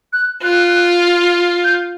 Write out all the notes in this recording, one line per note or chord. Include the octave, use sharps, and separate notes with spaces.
F#6
F4 F#6
G6